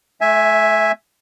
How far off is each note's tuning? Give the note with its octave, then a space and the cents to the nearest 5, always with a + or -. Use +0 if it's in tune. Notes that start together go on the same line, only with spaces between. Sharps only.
A3 -35 E5 +0 G#5 +0